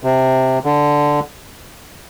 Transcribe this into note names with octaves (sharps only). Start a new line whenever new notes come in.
C3
D3